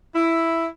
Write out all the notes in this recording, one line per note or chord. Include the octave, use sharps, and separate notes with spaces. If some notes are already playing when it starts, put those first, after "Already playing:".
E4